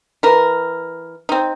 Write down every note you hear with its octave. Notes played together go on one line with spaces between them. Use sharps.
E3 A#4
C4 D#4